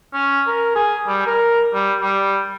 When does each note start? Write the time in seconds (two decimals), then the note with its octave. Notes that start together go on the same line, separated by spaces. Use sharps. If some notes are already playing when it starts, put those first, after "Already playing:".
0.13 C#4
0.47 A#4
0.76 G#4
1.07 G3
1.26 A#4
1.74 G3
2.00 G3